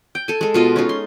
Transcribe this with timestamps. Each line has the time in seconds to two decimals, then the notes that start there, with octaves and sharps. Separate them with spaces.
0.15 G5
0.28 A4 G#5
0.41 G#3 A4
0.54 B2 F4 D#5
0.76 C#4 D#4 F4
0.89 C6